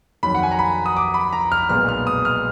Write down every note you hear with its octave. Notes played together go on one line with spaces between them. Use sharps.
F2 D#3 F#3 B5
F#5
G#5
A#5
B5
D#6
D6
B5
A#5
F6
B1 A#2 G#3 B3 F6
F6
D#6
F6